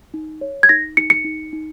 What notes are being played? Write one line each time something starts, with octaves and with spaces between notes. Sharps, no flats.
D#4
C#5
G#6
D#4 A#6
D#4 C#7
C#7
D#4
D#4